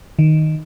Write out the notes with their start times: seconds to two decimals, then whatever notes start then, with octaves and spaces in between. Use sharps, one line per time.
0.19 D#3